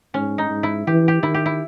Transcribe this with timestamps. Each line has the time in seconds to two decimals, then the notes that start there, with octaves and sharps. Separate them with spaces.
0.14 G#2 C#4
0.38 D#4
0.50 G#2
0.63 E4
0.87 E3 G4
1.08 G4
1.23 D#3 E4
1.34 G4
1.46 E4